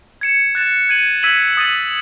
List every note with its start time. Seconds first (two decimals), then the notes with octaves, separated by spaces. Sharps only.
0.21 G#6 C#7 E7
0.55 F#6 A6 E7
0.89 G#6 D#7 F#7
1.23 E6 G#6 B6 D#7 F#7
1.57 D#6 A6 D#7 F#7